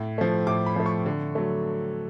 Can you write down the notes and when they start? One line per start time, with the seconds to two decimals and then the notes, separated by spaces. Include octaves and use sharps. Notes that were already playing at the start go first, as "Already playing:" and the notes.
Already playing: A2
0.18 F3 A3
0.47 A2 D6
0.66 B5
0.76 F3 A3
0.86 C#6
1.06 D3
1.35 F#3 A3